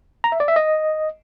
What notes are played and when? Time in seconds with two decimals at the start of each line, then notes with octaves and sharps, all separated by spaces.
0.24 A#5
0.32 E5
0.40 D5
0.48 E5
0.56 D#5